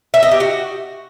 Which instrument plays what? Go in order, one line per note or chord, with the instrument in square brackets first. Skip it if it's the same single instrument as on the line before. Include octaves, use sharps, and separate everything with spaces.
[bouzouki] E5
D#5
G4
F#4